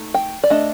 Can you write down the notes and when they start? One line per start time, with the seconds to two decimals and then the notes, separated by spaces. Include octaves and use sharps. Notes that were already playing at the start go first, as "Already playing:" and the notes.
Already playing: A3 D#4
0.14 G5
0.44 D5
0.50 A3 D4 D#5